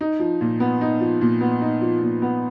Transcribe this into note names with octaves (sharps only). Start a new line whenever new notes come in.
D#4
F3
A#2
B3
D#4
F3
A#2
B3
D#4
F3
A#2
B3